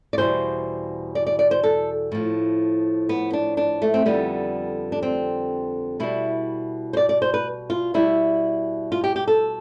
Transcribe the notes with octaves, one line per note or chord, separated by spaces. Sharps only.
D5
E2 B2 G3 C5
D5
D5
D5
C5
A4
A2 F3
B3
D4
D4
A3
C4
F2 D3 G3 B3
D4
C4
B2 G3 E4
C5
D5
D5
C5
B4
F4
B2 G3 E4
F4
G4
G4
A4